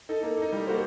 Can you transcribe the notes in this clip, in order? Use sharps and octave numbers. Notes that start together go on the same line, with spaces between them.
D#4 A4
A#3
A4
D#4
G3
A#3 F#4 A4 C5